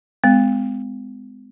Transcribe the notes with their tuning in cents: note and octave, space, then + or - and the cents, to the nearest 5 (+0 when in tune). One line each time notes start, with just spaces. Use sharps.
G#3 +0 C4 -45